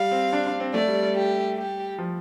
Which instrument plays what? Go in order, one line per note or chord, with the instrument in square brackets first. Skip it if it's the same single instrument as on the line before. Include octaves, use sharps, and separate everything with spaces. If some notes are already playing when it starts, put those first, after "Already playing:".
Already playing: [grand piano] G3 [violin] F5
[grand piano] C4
D4
D4
C4
[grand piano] A3 [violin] D5
[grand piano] G3
G3
[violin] G4
G4
[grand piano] F3